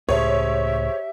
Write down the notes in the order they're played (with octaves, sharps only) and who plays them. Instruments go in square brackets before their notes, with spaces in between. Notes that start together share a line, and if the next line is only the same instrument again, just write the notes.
[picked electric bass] C#2 A2 [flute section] G4 E5 [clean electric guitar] G#4 C5 [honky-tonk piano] C#5